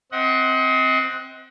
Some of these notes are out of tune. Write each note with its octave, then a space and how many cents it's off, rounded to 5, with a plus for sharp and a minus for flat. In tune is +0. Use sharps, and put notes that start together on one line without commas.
C4 +0 D#5 +35 F#5 +0